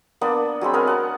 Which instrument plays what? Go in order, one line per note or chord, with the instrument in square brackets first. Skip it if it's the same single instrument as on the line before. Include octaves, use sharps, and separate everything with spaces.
[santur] A#3 B3 D4
F#3 G#3 C4 B5
B3 A#4 F5 G#5
F#5 A5